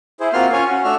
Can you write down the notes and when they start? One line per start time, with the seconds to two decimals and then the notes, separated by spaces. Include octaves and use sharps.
0.20 E4 G#4 C5
0.33 A#3 C4 F4 F#4 C6 F6
0.53 C#4 F4 C#5 F5 G#5
0.68 C#4 F#4
0.84 A3 D4 F#4 E5 F6